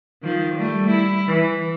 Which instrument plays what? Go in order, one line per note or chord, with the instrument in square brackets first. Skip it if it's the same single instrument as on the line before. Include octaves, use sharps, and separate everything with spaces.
[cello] D#3 F3
G3 A3
E4
E3